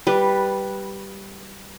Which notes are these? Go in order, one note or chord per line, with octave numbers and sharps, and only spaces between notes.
G3 B4